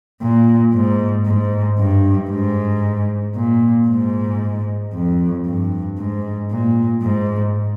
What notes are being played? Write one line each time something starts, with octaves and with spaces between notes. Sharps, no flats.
A#2
G#2
G#2
G2
G#2
A#2
G#2
F2
G2
G#2
A#2
G#2